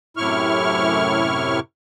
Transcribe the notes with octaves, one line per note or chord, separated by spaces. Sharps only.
F#2 A2 C3 E4 C#6 F6